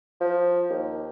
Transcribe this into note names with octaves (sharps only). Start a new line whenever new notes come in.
F3
D#2